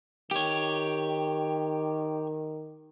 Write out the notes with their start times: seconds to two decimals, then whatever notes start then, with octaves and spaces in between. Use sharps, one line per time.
0.31 D#3 G4 C#5